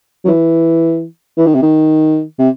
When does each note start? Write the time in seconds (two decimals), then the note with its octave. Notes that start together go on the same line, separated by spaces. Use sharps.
0.25 F#3
0.28 E3
1.38 E3
1.47 D#3
1.55 C3
1.62 D#3
2.39 C3